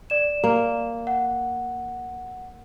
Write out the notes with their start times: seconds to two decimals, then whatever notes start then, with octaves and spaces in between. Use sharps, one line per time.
0.10 D5 E7
0.44 A#3
1.07 F#5